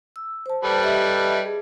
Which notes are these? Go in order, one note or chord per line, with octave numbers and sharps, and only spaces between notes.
E6
C5 A5
G3 A4 B4
G4 D#5 E5
G#4